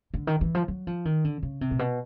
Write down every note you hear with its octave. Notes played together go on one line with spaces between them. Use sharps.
D3
D#3
E3
F3
F#3
F3
D#3
D3
C#3
C3
A#2
B2